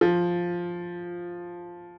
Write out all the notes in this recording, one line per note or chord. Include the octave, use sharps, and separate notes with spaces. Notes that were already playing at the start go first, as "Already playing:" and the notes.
F3